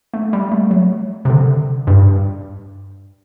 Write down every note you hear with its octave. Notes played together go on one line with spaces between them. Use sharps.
A3
G3
A3
F#3
C3
D3
G2